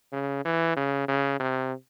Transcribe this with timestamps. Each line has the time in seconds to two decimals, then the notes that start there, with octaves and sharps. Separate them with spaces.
0.12 C#3
0.45 E3
0.77 C#3
1.08 C#3
1.40 C3